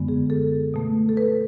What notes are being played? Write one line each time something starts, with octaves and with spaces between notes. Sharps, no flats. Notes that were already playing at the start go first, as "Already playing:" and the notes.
Already playing: F#2 D3 G#3 B3
G#4
A4
B2 A3
A4
B4